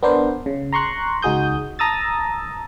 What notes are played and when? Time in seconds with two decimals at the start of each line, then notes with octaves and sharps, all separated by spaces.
0.03 B3 D4 A#4 C5
0.46 C#3
0.73 A#5 C6 C#6 F#6
1.22 C#2 D#4 F#4 G#4 D#6 G6
1.79 A5 A#5 D#6 E6 A6